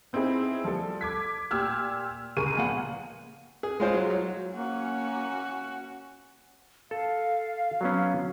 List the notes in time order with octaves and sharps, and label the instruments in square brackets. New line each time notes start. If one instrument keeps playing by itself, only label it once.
[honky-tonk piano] B3 C4 D#4 E4 G#4
F3 G3 A4
D6 G#6 B6
A#2 G4 E6 F6 G#6
C#2 G#4 A#4 C#6 D#7
A#2 F3 B3 F5 F#5
[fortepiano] G#4
G#3 F4 C5
F#3
F#3
[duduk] A#3 [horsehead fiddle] C#4 F#4
[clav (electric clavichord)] A4 [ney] F5
[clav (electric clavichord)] F#3 B3 C#4